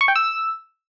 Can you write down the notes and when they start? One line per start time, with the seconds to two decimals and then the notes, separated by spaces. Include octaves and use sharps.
0.01 C#6
0.08 G5
0.16 E6